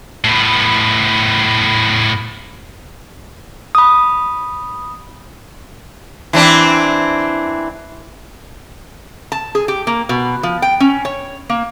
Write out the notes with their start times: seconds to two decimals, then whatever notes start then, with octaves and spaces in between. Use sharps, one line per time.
0.24 A2 B3
3.75 B5 D#6
6.33 E3 C4 D4
9.32 A5
9.55 G#4
9.68 G4
9.87 A#3
10.09 B2
10.43 F3
10.62 G5
10.80 C#4
11.05 C#5
11.50 A#3